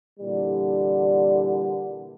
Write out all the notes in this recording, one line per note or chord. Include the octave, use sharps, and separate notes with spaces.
A#2 D3 E3 G3